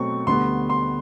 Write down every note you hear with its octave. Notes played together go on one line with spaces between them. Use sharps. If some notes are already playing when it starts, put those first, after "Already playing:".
Already playing: B2 F#3 A3 C4 C#6
D2 D3 G3 B3 C6
C6